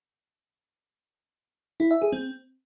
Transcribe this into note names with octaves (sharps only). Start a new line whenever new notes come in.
E4
E5
G#4
C4